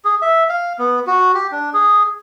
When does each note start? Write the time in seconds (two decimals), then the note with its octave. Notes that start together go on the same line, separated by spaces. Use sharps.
0.05 G#4
0.22 E5
0.49 F5
0.79 B3
1.07 F#4
1.34 G4
1.52 D4
1.74 G#4